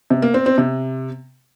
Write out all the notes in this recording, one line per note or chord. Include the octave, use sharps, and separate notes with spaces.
C3
A#3
C4
C4
C3